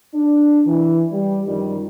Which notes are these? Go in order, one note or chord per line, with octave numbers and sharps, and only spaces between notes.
D4
E3
G3
F#2 D#3 F3 G3